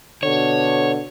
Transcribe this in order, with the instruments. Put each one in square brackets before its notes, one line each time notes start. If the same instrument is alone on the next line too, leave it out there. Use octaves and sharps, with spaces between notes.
[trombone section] B2 D3 [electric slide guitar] C#5